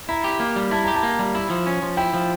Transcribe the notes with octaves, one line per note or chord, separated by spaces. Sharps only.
E4 A#5
G4
A#3
G3
E4 A5
G4 A#5
A5
A#3
G3
E4
F3
C#4
F3
E4 G5
F3